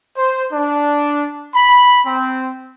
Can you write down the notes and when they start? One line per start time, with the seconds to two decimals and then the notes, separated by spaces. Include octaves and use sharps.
0.16 C5
0.53 D4
1.54 B5
2.06 C4